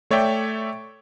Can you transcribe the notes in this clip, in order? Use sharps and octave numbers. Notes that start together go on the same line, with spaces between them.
A3 C#5 D5 E5 G5